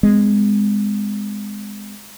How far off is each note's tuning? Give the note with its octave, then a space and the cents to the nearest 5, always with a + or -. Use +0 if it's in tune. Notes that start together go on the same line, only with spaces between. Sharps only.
G#3 -10 C4 -45